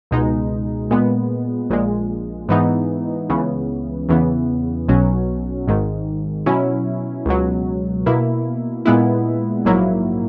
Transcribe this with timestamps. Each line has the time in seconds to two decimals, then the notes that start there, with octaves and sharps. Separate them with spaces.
0.11 C#2 B2 G#3 D#4
0.91 A#2 G#3 B3
1.70 A#1 A#2 G#3
2.49 G#2 E3 B3 D#4
3.29 C#2 C#3 E3 B3
4.09 E2 C#3 E3 B3
4.88 B1 B2 F#3 C#4
5.67 G#1 G#2 D#3
6.46 B2 F#3 C#4 E4
7.26 C#2 B2 F#3
8.06 B2 A#3 E4
8.85 A#2 G#3 B3 E4
9.65 A#1 G#2 F#3 A#3 E4